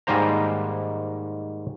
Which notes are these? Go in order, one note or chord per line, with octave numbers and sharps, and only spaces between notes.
G#2 D#3 G3 A#3 C5 A#5